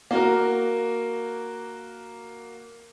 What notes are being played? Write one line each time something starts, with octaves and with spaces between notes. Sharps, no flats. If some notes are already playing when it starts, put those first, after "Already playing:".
A#3 F#4 A#4